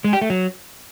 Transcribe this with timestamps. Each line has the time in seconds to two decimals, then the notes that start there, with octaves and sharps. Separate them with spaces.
0.04 G#3
0.13 G4
0.22 A3
0.30 F#3